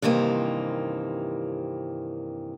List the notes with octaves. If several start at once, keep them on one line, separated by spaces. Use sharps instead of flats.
G2 C3 D#3 E3 A#3 C4